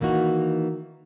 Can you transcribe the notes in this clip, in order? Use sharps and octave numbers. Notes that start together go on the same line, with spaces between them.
D#3 E3 A#3 D#4 F#4